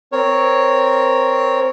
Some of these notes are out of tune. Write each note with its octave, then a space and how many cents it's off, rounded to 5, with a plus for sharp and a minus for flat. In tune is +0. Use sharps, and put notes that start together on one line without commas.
C4 -5 A#4 +0 C#5 +0